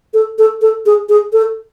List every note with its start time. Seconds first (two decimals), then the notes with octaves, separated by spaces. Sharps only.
0.14 A4
0.38 A4
0.62 A4
0.86 G#4
1.09 G#4
1.33 A4